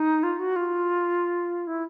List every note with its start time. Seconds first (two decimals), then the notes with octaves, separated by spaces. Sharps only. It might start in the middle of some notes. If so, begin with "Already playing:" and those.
Already playing: D#4
0.23 F4
0.39 F#4
0.56 F4
1.67 E4